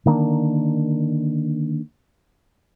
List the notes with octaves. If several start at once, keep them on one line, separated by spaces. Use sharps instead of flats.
D3 D#3 A#3 D4